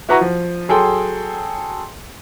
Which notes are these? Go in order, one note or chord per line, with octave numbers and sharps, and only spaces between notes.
E4 F#4 B4 F#5 A#5 C#6
F3
F#3 G#4 A4 G5 C6